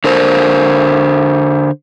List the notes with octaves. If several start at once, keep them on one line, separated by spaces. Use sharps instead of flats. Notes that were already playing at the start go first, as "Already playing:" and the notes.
D3 A#4 C5